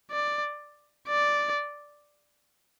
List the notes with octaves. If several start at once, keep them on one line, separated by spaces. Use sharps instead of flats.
D5
D5